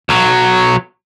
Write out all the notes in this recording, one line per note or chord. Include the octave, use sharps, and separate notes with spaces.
B1 F#3